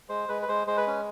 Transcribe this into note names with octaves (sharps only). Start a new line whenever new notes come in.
G#3 C5
G#3 B4
B4
G#3 C5
G#3 C5
B4
C#4